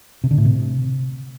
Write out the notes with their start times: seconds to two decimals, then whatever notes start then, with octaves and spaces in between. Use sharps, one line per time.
0.24 C3
0.31 D3
0.38 A2
0.45 C3